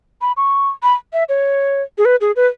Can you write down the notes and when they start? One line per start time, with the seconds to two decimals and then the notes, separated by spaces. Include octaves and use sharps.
0.22 B5
0.37 C#6
0.83 B5
1.13 E5
1.29 C#5
1.98 G#4
2.05 B4
2.21 G#4
2.36 B4